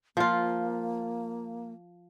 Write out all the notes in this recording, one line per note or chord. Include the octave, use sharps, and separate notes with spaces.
F3 A#3 F4